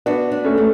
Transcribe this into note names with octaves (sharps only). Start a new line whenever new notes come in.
B3 D4 F#4
D4
A3 C#4
A3